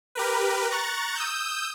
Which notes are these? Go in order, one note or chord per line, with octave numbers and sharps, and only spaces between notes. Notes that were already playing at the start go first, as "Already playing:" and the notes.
G4 A#4 B4
A#5 C#6 F#6 A6
D#6 E6 G6